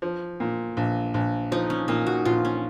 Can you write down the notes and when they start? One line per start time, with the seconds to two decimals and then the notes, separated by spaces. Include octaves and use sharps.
0.02 F3
0.40 A#2
0.77 A#1
1.14 A#1
1.52 F3 D#4
1.70 C#4
1.88 A#2 D#4
2.07 F#4
2.25 A#1 F4
2.45 C#4